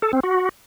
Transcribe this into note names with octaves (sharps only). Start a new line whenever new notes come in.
A4
C4
F#4